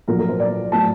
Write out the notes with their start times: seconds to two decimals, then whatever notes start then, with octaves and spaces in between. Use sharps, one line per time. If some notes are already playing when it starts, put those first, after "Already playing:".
0.08 A#1 A#2 F#3 A#4
0.18 A#4
0.29 C5
0.40 D5
0.72 A2 F#3 A5